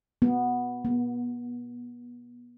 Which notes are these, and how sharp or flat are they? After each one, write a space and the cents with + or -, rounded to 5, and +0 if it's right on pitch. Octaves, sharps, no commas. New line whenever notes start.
B3 -5
B3 -30